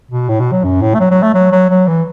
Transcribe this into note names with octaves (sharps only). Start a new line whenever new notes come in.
B2
A2
B2
F#3
F#2
A2
A3
F#3
F#3
A3
F#3
F#3
F#3
E3